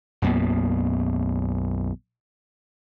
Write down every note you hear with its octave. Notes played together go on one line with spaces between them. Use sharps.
B1 F#2 A#3 B3